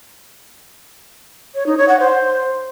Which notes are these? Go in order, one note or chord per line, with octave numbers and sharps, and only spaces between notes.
C#5
D#4
C#5
F#5
C5